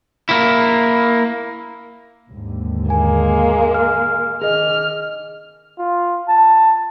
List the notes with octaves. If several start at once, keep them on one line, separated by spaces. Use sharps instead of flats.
A#3 E4
D#2 G#2 D3
G#3 A#3 G#5
F6
D#3 G#4 D#5 F6
F4
A5